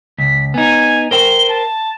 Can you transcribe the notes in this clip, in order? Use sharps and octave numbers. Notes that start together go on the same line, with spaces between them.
C#2 B6
B3 D#4 G#5
A#4 C5 G5 G7
A5